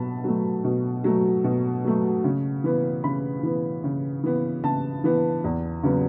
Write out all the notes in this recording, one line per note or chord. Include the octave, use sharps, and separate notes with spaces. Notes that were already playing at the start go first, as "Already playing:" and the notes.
Already playing: B2 F#3 A5 B5
F#3 A3
B2
F#3 A3
B2
F#3 A3
C#3
E3 B3
C#3 B5
E3 B3
C#3
E3 B3
C#3 A5
E3 B3
E2
C#3 F#3 B3